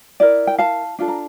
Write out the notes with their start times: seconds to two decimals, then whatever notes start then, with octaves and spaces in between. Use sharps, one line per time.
0.20 E4 A#4 D5
0.47 G5
0.58 F5 A5
0.99 D4 F4 A4
1.08 A#5